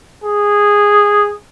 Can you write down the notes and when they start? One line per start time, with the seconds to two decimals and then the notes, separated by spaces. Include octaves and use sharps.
0.24 G#4